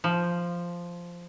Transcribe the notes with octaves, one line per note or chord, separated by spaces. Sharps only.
F3